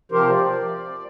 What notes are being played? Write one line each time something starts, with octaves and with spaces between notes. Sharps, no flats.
C3 F3 G4 A#4 C5
D5